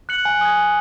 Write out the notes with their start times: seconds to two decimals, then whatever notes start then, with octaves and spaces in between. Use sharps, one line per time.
0.09 F#6 C#7 F#7
0.25 G#5
0.41 D#6 G#6
0.57 G#5